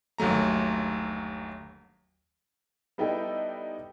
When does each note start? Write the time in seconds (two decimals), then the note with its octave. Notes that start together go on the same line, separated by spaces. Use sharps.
0.18 G1 D#2 F#3 A3 A#5
2.98 G3 B3 D#4 E4 A4 G5